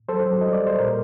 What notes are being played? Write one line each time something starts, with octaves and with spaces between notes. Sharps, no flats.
F#3 A4 C5
F#3
G3 D#5
D5
G3
C5
A#2 A#4